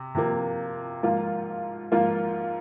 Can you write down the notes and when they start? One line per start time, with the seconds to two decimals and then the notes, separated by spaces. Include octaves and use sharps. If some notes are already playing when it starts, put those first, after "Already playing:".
Already playing: C3
0.15 C3 F3 A#3
1.03 G#2 F3 A#3 F4
1.92 G#2 F3 A#3 F4